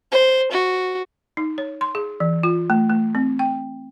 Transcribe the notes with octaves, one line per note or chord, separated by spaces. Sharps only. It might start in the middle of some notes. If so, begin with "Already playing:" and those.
C5
F#4
D#4
C#5
C6
G#4
E3
F4
A3
A3
C4
G5